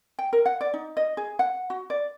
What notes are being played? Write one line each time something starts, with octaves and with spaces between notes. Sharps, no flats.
G5
A#4
F#5
D5
D#4
D#5
G#4
F#5
F#4
D5